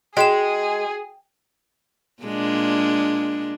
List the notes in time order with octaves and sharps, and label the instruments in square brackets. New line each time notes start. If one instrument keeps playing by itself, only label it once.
[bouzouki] G#3 [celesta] F#4 [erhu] G#4 [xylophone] G5 D7 E7
[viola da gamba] A#2 G#3 D4